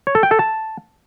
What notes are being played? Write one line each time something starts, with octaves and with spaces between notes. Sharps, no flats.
C#5
A4
G5
A4
A5